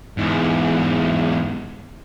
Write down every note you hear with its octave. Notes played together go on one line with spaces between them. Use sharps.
E2 G#2